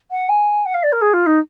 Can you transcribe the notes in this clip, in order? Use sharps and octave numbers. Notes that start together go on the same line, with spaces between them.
F#5
G#5
F#5
F5
D5
A#4
G#4
F4
D#4